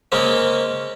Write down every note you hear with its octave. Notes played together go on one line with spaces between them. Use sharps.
C#3 G#3 A#3 C4 C#4